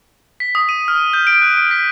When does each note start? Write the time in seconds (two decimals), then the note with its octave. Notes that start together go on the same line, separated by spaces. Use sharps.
0.40 B6
0.55 D#6
0.69 D#7
0.88 F6
1.13 G6
1.27 D7
1.42 F#6
1.57 D7
1.71 B6